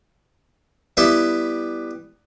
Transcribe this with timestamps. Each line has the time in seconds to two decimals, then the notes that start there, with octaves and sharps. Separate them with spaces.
0.97 G3 B3 E4 G4 E5 F#5